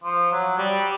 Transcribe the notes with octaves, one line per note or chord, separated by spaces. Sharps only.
F3
F#3
G3